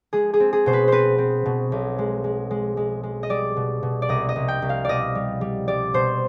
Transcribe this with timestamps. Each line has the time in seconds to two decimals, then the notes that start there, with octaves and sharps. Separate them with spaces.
0.13 G#3 G#4
0.33 G#4
0.40 C4
0.53 G#4
0.66 B2 C5
0.73 B4
0.88 C4 B4 C5
1.18 C4
1.46 B2
1.72 B1
1.98 G#3
2.24 G#3
2.51 G#3
2.77 G#3
3.03 G#3
3.23 D#5
3.30 G3 D5
3.57 B2
3.83 B2
4.02 D5
4.09 C2 D#5
4.29 D#5
4.36 C2
4.48 G5
4.62 C2
4.69 F5
4.85 B2 D5 D#5
5.15 G3
5.41 G3
5.68 G3 D5
5.94 B2 C5